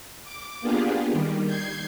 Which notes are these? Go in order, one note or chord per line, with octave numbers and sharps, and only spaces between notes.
D6
A#3 B3 D4 F4 G4 G#4
D#3 G3
G6 G#6 C7